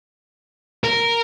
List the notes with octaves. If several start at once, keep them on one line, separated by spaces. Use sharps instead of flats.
A#4